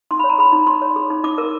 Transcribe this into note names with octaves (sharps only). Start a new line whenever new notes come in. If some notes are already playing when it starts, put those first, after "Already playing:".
D#4 C6
C#5 B5
A#5
G#4 B5
D#4
D#4 C6
C#5
G#4
D#4
D#4 D6
A#4